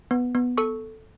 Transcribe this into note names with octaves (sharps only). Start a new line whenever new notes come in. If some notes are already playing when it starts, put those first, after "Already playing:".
B3
B3
A4 C#6